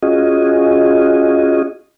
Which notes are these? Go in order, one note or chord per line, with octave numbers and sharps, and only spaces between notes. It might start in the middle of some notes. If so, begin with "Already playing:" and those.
C#4 F4 F#4 G#4 D#5